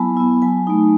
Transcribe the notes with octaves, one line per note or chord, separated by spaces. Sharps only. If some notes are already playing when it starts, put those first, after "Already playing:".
Already playing: F#3 B3 E4 G#5 A5 B5
B3 E4
F#3 G#5
A3 D#4